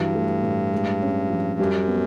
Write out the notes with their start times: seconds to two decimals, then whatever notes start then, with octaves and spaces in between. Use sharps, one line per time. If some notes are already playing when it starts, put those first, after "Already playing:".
Already playing: G2 E3 F#3
0.14 A3
0.43 A2
0.72 G#3
1.02 C#4
1.30 F3
1.59 F#2 G3
1.88 B3